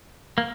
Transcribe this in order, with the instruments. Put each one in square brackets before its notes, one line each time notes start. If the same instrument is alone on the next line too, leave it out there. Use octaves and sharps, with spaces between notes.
[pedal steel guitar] A#3